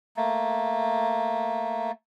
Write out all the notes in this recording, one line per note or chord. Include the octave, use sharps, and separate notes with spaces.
A3 A#3